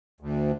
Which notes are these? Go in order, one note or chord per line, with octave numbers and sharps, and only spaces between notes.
D2